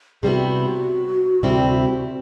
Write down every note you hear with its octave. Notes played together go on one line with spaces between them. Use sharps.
C3 G3 B3 E4 F#4 G#4
D2 C3 G3 C4 E4